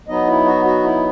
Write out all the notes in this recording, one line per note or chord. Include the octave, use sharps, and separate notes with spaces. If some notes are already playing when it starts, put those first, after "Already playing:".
F#3 B3 D#4 D#5
E4
F#4
F#4
E4